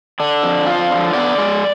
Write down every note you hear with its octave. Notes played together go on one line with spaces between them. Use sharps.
D3 D4
F2
F3 F4
D3
B3 D5
G#3